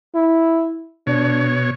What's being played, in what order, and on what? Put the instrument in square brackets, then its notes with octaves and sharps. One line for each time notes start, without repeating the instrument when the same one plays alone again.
[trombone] E4
[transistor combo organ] B2 C#5 [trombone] D4